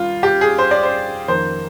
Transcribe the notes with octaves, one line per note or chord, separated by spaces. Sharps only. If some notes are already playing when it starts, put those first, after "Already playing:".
Already playing: D#3 G3 F4
G4
G#4
C5
D5
C5
F2 D#3 A#3 C5